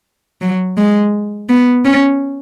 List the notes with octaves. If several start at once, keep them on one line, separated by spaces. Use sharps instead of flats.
F#3
G#3
B3
C#4